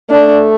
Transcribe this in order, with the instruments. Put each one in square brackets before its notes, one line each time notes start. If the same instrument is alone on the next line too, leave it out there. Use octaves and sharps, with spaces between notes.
[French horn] A3 [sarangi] D4